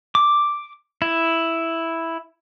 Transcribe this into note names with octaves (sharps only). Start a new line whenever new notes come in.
D6
E4